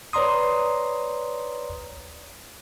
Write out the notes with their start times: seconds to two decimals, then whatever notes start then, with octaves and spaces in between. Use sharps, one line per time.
0.13 B4 C#5 D5 A#5 C6 D#6